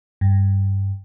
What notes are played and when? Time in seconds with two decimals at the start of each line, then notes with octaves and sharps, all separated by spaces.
0.21 G2